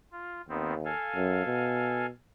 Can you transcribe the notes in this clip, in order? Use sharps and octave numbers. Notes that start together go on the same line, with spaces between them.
F4
D#2 D#3 B3 C4
A4 F5 G#5
F#2
B2